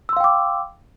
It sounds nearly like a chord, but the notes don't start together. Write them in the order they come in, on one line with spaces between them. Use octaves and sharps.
E6 C6 F5 G5 D6